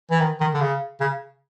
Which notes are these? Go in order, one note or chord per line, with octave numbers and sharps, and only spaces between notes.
E3
D#3
D#3
D3
C#3
C#3